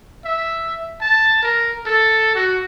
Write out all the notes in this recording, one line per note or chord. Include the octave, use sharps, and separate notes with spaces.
E5
A5
A#4
A4
F#4